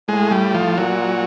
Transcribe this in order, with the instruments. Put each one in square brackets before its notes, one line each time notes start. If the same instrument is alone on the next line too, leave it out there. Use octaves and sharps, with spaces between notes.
[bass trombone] A2 [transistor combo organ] G#3
[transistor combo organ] G3
F3
[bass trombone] A#2 [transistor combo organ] F#3